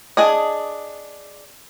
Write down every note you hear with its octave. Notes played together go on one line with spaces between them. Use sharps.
D4 G#4 D#5